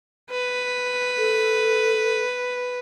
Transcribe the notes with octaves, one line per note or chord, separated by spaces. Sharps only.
B4
A4